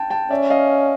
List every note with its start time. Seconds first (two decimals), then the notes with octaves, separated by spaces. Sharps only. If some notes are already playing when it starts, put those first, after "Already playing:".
Already playing: G5 A5
0.10 G5 A5
0.30 C#4 D5 E5
0.50 D#5 F5